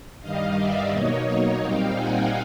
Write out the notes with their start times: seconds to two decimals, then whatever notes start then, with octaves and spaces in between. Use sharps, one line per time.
0.21 G2 D#3 G3 D#5 F5
0.56 D5 E5
0.91 B2 F#3 A#3 D#4 C#5 D#5
1.60 A#2 G3 C4 D#4 F5 G5
1.95 F#5 G#5